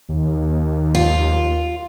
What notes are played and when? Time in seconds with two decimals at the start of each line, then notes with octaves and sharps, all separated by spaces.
0.09 D#2
0.95 F4